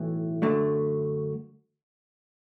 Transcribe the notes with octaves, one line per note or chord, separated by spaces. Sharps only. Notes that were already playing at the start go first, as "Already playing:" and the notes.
Already playing: B1 A2 E3
F#2 D3 F#3 A3